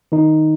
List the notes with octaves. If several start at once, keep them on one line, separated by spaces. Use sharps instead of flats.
D#3 D#4